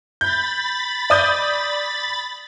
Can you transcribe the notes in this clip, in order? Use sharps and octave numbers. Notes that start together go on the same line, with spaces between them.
B5 G6 A6
D5 D#6 G6